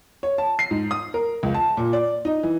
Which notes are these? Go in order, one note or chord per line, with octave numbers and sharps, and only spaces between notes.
C#5
A5
C7
G#2
D#6
A#4
C#2
A5
A#2
D5
D#4
E3